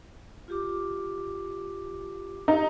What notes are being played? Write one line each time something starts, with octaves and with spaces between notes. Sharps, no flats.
F4 G4 D6
D#4 G4